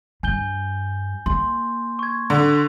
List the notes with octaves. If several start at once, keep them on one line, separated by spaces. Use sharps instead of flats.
G2 G#5 G6 G7
A#3 C6
C#6 G#6
D3